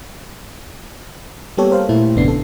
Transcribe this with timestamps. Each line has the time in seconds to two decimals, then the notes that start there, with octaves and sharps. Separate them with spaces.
1.57 G3 A#3 B3 G4 A4 C#5
1.71 A#4 C5 F5
1.89 A#2 A3 E4
2.15 G#1 F2 C#3 B3 D4 C7
2.28 A4